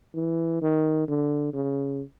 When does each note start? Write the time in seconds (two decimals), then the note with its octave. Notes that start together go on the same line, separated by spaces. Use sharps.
0.15 E3
0.62 D#3
1.08 D3
1.53 C#3